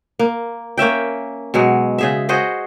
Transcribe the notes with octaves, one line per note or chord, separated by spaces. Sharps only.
A#3
A#3 C#4 E5 G5
B2 F#3 G#3
C#3 G#4 E5
F#4 G#4 C5 D#5